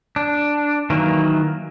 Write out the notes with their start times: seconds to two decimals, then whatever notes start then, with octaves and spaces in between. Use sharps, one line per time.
0.16 D4
0.90 D#3 E3 F#3 A#3